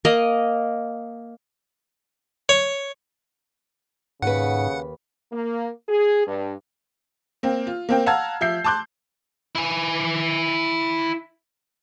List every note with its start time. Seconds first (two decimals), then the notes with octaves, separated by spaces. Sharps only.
0.05 A#3 D#5
2.49 C#5
4.22 D#2 G#2 C#3 B4 F#5
5.32 A#3
5.89 G#4
6.27 G2
7.43 A#3 C4
7.67 F4
7.89 A#3 C4 G5
8.06 F5 F#5 A5 A#5 E6 G#6
8.41 F3 E5 G6 C7
8.64 A5 C6 D6 F#6 G6
9.55 E4 G#5